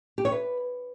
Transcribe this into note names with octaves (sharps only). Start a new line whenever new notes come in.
G4
C#5
B4